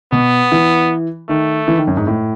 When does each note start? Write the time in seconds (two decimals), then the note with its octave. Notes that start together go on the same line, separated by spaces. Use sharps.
0.12 B2 B3
0.52 E3
1.29 D#3 A3
1.68 E3
1.78 D#3
1.87 F#2
1.97 G#2
2.07 A2